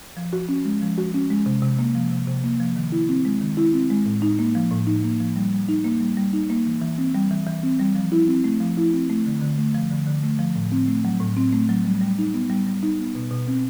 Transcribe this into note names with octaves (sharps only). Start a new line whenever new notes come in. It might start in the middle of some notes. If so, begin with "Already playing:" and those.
F3
F#4
C#4
G#3
F3
F#4
C#4
G#3
C3
C3
A#3
F3
C3
C3
A#3
F3
D#3
E4
C4
G#3
D#3
E4
C4
G#3
A2
D#4
A#3
F3
A2
D#4
A#3
F3
G3
G3
D#4
A#3
G3
G3
D#4
A#3
E3
E3
C4
G3
E3
E3
C4
G3
F3
E4
C4
A3
F3
E4
C4
A3
D3
D3
A3
F3
D3
D3
A3
F3
A2
C4
A3
F#3
A2
C4
A3
F#3
G3
G3
D#4
B3
G3
G3
D#4
B3
B2
B2
C4